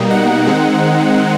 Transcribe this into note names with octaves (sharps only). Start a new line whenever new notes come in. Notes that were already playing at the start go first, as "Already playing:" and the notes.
Already playing: B2 G3 A#3 D#4
F#5
D#3 G#3 C4 D#4